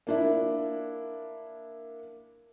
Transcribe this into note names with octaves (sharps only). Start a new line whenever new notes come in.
A#3 D4 E4